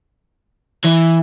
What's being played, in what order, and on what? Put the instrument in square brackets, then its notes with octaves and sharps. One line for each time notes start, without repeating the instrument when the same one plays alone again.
[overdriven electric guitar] E3